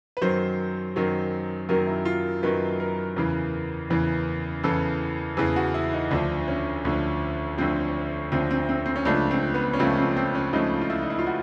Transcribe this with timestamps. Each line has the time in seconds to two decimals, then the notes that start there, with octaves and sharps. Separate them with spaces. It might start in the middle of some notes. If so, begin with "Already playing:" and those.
0.17 B4
0.21 F#2 D#3 F#3 C5
0.96 F#2 D#3 F#3
1.69 F#2 D#3 F#3 A#4
1.87 E4
2.05 F4
2.43 F#2 D#3 F#3 B4
2.80 A#4
3.16 E2 C#3 E3
3.90 E2 C#3 E3
4.64 E2 C#3 E3 A4
5.37 E2 C#3 E3 G#4
5.56 F#4
5.74 E4
5.93 D#4
6.11 D2 D3 F3 D4
6.48 C#4
6.85 D2 D3 F3
7.58 D2 D3 F3 C4
8.32 D2 D3 F3 C4
8.51 C4
8.69 C4
8.86 C4
8.96 C#4
9.05 C#2 C#3 F3 A3 D4
9.31 C4
9.54 B3
9.73 C#4
9.79 C#2 C#3 F3 A3 C4
9.97 C4
10.16 C4
10.35 C#4
10.53 C#2 C#3 F3 A3 D#4
10.81 F4
10.90 E4
11.02 D#4
11.10 E4
11.19 F4
11.27 F#4